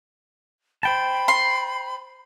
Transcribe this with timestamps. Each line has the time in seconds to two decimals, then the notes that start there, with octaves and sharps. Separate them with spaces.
0.83 C5 G5 A5 B5
1.28 C6